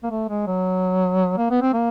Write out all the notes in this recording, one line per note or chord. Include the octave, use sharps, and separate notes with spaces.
A#3
A3
G#3
F#3
A#3
B3
C4
A#3